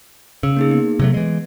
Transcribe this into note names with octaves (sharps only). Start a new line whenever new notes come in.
C#3 E6
A#3 D#4 G#4
B3
C3 F#3 A3
E3 G#3